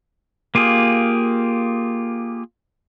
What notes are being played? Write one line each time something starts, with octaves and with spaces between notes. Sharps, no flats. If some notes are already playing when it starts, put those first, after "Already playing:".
A#3 F4 G4 G#4